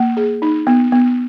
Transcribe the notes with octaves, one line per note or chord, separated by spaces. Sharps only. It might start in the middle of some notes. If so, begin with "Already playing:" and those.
Already playing: A#3
G#4
D#4
B3
B3